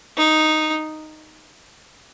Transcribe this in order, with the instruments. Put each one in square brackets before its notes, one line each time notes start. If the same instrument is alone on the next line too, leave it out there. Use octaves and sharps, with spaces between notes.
[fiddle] D#4